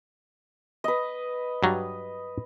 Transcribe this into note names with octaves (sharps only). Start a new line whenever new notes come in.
B4 D#5
G2 F#3 G3